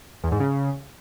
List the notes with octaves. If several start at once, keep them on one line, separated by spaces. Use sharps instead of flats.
E2
G#2
C#3